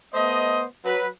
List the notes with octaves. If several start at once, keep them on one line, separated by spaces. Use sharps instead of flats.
A3 B3 C5 D#5
F#3 B4